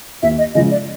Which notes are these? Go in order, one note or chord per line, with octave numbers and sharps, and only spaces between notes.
D#2 E5
D#5
C#3 F3 G#3 D#5
D5